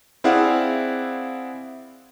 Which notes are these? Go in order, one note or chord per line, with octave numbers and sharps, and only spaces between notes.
C4 E4 G#4 D5 F5 F#5